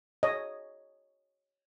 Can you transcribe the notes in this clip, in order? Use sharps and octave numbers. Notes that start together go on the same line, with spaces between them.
C#5 D#5